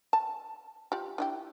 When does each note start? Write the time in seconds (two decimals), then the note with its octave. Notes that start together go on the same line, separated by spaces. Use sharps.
0.13 A5
0.92 F4 G4
1.18 D4 E4 G4